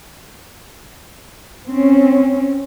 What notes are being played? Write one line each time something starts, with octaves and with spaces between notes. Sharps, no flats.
C4 C#4